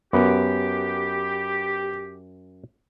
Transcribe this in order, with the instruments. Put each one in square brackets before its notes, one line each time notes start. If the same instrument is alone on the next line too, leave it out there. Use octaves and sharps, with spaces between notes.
[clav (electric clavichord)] F#2 [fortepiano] B3 [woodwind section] G4